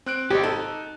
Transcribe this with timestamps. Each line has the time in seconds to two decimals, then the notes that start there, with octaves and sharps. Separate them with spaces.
0.06 C4 F#6 D7
0.31 G#1 C4 G4 D#5
0.44 D#4 A4